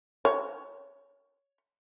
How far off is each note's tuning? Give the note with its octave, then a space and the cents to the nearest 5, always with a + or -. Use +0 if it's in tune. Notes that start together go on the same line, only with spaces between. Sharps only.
C#5 +15